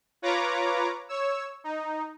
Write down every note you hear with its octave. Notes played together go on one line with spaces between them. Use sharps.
F4 B4 C#5 A#5 D6
C#5 E6
D#4